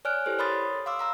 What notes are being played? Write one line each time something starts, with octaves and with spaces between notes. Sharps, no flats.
C#5 D5 G#5 F6 F#6 D7
E4 G4 A4 C5
A#4 C#5 B5 C6 D#6 A6
F5 C6 D6 E6
F5 A#5 E6